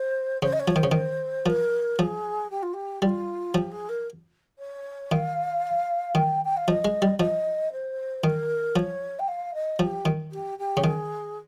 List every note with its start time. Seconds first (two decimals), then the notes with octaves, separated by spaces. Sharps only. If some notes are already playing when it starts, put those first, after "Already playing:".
Already playing: C5
0.42 C#3 C5
0.53 D#5
0.60 C#5
0.68 F3
0.76 D#3 C5
0.83 C#3
0.92 D#3
1.46 F3 A#4
1.99 F3 G#4
2.50 G4
2.62 F4
2.73 G4
3.02 G3 F4
3.54 F3 G4
3.72 G#4
3.89 A#4
4.59 C#5
5.12 D#3 F5
6.15 D#3 G5
6.45 G5
6.57 F5
6.68 F3 D#5
6.85 G#3
7.02 G3
7.19 F3 D#5
7.72 C5
8.24 D#3 A#4
8.76 F3 C#5
9.19 G5
9.28 F5
9.54 D#5
9.79 F3 G4
10.05 D#3
10.32 G4
10.59 G4
10.77 C#3
10.84 D#3 G#4